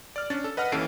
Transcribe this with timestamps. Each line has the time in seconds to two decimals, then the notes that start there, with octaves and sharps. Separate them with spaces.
0.16 D5 F6
0.30 C#4 D4 A6
0.44 A4
0.57 B4 D#5 F#5 F6
0.72 D#2 E3 C#4 A4 C7 D7